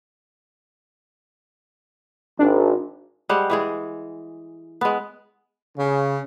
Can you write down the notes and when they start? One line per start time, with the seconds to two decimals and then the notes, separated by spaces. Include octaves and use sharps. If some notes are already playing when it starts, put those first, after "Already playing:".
2.39 G#1 D4
3.29 G3 G#3 C5 F#5
3.50 E3 G#3 G#4
4.81 G#3 B3
5.78 C#3